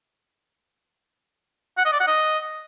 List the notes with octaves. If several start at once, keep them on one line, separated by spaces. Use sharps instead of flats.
F#5
D#5
D5
F#5
D#5